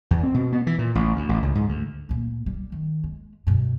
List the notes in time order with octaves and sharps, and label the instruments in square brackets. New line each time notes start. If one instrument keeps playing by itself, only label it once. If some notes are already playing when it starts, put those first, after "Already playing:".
[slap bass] E2
C4
B2
B3
E3
A#2
A1
D2
A1
C#2
G#2
D2
[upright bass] D2 A#2
C#2 G3
D#3
G#3
G2 B2